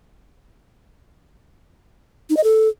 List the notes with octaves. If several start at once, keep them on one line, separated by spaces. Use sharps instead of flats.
D#4
D#5
A4